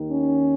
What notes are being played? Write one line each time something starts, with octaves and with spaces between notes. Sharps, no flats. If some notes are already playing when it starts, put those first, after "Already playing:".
Already playing: D#2 D#3
C#4